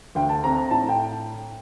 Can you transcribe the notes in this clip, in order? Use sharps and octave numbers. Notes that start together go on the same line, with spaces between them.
D2 G5
A5
C4 A#5
A#5
A2 A5
G5